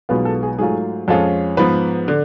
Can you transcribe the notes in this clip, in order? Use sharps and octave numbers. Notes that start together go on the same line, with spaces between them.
B1 B2 G#3 B3 F4 B4
A4
G#4
G#2 F#3 A3 F4 G#4
F2 F3 G#3 C#4 F4 A4
G#2 F3 B3 B4
D3